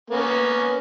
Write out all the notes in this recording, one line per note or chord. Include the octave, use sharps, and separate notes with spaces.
A#3 B3 C#4